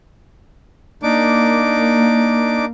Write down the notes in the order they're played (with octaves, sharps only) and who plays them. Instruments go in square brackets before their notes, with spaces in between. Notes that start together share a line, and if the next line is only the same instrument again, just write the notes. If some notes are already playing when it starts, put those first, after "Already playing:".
[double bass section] A#3 [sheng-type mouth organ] D4 D#4 D6